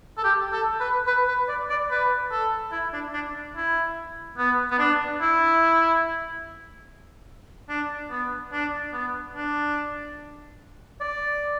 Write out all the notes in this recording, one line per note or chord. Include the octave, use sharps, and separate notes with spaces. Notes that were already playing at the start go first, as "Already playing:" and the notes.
A4
G4
A4
B4
B4
B4
D5
D5
B4
A4
E4
D4
D4
E4
B3
B3
D4
E4
D4
B3
D4
B3
D4
D5